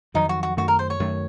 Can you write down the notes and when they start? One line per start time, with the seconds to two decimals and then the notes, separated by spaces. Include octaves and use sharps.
0.14 F2 D#3 F#3 D#4
0.29 F#4
0.43 F#4
0.57 F#2 D#3 A3 F#4
0.68 A#4
0.79 C5
0.90 C#5
1.00 F#2 D#3 A3